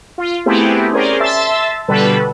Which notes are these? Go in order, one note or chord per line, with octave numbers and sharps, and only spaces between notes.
F4
A3 B3 C4 E4 G4 G#4
C#4 G#4 A#4 C5 D5
E5 A5 C6 E6 A6
B2 D3 G3 A4 B4